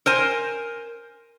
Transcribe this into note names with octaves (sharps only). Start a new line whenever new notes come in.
A#4 C5 G#5